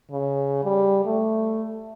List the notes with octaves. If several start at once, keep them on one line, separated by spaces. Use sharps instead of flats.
C#3
G3
A3